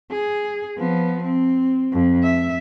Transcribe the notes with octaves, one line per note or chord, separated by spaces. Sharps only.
G#4
F3 B3
C4
F2
E5